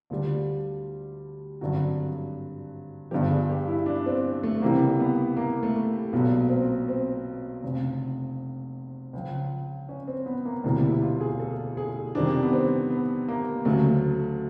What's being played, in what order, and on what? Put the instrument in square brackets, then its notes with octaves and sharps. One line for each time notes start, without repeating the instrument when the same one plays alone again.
[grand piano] D2 D3 G3 F4
G#1 G2 D3 F#3 F#4
G1 G2 D3 F3 G4
G#4
G4
E4
D4
C4
A3
C#2 C3 E3 G3 A#3
B3
A#3
A3
B1 A#2 F#3 B3
C4
C4
F1 F2 C#3
C#2 C#3 F3
C#4
C4
B3
A#3
E1 D2 C3 E3 G3 A#3
E4
F4
G#4
A4
G#4
F2 C3 D#3 G3 D4
B3
C4
B3
A#3
D2 C#3 F#3 A3